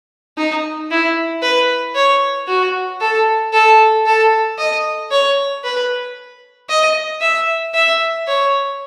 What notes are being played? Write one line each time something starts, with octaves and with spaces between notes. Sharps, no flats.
D#4
E4
B4
C#5
F#4
A4
A4
A4
D#5
C#5
B4
D#5
E5
E5
C#5